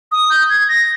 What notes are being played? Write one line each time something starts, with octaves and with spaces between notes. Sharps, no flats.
D#6
G6
G#6
A#6